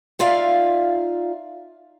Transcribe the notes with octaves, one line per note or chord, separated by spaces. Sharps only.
D#4 F4 D5 E5 F5